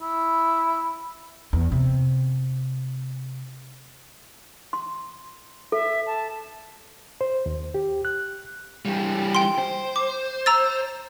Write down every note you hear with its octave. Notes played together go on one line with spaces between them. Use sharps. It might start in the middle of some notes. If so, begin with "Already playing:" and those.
E4
E2
C3
C6
A4 E5
A5
C5
D#2
G4
F#6
E3 G3
G5 C6
C5
D6
A#5 E6 A6